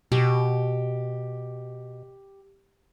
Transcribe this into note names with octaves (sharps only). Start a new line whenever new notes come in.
B2 G4